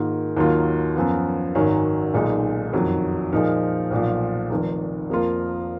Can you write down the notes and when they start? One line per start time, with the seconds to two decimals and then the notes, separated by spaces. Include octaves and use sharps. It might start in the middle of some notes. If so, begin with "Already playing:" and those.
Already playing: G#2 D#3 A#3 F4 A#4
0.37 D#2 D#3 F#3 A#3 F4
0.95 F#2 F3 B3
1.55 G#1 F#2 D#3 F#3 C#4
2.14 B1 A#2 G#3 D#4
2.72 F#1 F2 D#3 F#3
3.32 A#2 F3 G#3 D#4 A#4
3.91 B1 A#2 F3
4.50 F1 F2 D#3
5.10 F2 F3 A#3 F4 A#4